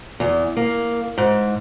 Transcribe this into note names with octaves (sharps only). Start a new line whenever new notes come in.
E2
A#3
G#2